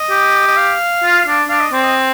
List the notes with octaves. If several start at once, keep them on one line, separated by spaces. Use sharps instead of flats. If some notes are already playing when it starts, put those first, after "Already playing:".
Already playing: D#5
G4
D#5
F5
F4
D4
D4 F5
D#5
C4 D5
D#5